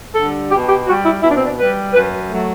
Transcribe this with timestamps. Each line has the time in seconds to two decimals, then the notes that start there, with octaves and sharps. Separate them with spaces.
0.14 D3 G3 A4
0.51 B2 G4
0.68 G4
0.86 G3 F#4
1.04 E4
1.21 B2 E4
1.29 D4
1.36 C4
1.44 D4
1.58 G3 B4
1.93 F#2 B4
2.30 F#3 A3